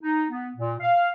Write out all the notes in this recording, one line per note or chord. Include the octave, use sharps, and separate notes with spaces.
D#4
B3
A#2
F5